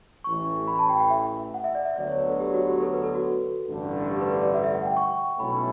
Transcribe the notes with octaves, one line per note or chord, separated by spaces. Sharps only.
A1 A2 E3 C#6
B5
A5
G5
G5
E5
F#5
E5
D5
E5
D2 D3 F#3 B3 D5
C#5
B4
A4
G4
F#4
G4
A4
B4
A4
F#4
A1 G2 D3 A3 D4
G4
B4
B4
D5
E5
E5
F#5
G5
C#6
B1 B2 A3 C#4 E4 B5